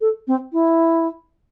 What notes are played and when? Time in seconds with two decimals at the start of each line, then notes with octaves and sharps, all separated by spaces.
0.01 A4
0.27 C4
0.53 E4